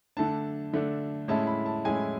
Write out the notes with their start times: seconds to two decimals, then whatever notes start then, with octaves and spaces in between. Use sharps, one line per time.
0.17 D3 A3 D4 A5
0.73 D3 A3 D4
1.28 A2 G#3 C#4 E4 A5
1.47 B5
1.66 A5
1.84 A2 G#3 C#4 E4 G#5